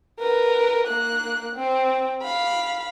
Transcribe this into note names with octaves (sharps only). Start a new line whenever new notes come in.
A#4 B4
A#3 F#6
C4
F5 B5